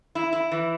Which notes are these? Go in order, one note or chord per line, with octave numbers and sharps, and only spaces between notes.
E4
E4
E3